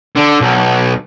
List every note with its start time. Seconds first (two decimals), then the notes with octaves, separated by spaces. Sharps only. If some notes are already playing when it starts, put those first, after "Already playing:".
0.16 D3
0.41 B1